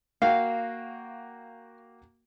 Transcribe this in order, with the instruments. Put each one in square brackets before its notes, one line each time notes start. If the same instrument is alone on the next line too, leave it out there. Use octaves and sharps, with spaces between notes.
[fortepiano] A#3 F#4 G5 [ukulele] F5